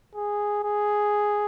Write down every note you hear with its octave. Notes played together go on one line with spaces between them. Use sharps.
G#4
G#4